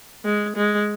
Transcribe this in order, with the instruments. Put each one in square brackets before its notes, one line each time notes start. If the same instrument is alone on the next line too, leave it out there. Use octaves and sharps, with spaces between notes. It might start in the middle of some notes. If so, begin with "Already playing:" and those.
[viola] G#3
G#3